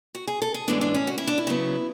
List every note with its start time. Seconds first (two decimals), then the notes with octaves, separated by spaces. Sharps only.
0.15 F#4
0.27 G#4
0.42 A4
0.54 G#4
0.68 A2 E3 G#3 B3 D4
0.81 D4
0.94 C#4
1.07 F#4
1.18 E4
1.27 D4
1.38 E4
1.47 C#3 F#3 B3